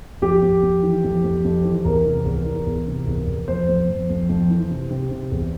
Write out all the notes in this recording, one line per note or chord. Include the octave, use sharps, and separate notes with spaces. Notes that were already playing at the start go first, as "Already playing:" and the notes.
F2 G4
F2
F2
E3
F2
F2
F2
E3
E2 A#4
C3
E2
E3
E2
C3
E2
E2
F2 C5
F2
F2
F2
F2
E3
C3
C3
C3
E2